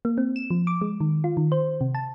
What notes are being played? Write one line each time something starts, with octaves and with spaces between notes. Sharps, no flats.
A#3
C4
E7
F3
D6
G#3
D#3
F4
D#3
C5
C3
A5